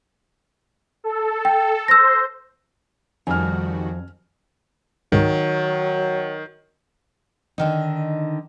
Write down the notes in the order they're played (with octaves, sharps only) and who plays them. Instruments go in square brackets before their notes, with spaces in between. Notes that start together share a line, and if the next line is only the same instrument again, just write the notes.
[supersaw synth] A4
[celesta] G5
[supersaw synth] C5 [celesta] E6 A#6
[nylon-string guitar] F2 [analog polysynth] D#3 G3 F#4 [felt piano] G#5 F6
[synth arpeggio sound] C#2 G#2 [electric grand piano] D#3 [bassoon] F#3
[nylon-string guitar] D3 D#3 D#4